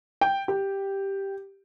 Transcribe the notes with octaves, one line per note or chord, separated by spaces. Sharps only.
G5
G4